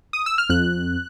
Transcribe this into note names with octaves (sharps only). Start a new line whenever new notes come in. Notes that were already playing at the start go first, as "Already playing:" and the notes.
D#6
E6
F6
F2 F#6